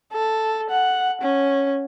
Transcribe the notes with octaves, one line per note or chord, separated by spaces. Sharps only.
A4
F#5
C#4